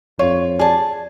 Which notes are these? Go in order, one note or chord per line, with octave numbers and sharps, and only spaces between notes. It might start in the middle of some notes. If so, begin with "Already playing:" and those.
F2 F4 C#5
G#4 D5 A5